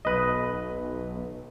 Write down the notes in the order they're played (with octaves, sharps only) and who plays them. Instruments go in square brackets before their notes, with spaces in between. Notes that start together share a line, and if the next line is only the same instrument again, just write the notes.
[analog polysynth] B1 [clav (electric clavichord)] B4 D#5